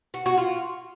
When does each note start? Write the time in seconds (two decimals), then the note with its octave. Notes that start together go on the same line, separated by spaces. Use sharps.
0.14 F#4
0.26 F#4
0.38 F4